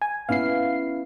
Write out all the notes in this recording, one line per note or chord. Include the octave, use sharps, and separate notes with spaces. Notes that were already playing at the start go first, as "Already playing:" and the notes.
G#5
B3 C#4 E4 F5 C7